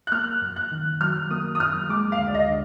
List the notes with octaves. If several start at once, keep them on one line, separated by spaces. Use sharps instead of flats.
F#6
A#3 F6
F#2
F#6
D#3
F#3 F6
A#3 D#6
D#6
F#2 F6
G#3 D6
F5
D2
D5
D#5
D3